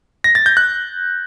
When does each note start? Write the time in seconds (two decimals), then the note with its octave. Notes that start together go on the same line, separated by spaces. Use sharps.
0.24 A#6
0.35 A6
0.46 G6
0.57 F#6